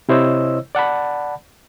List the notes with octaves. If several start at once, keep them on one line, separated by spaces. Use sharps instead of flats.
C3 E4 C5 C#5 D#5 E6
D5 F#5 A5 B5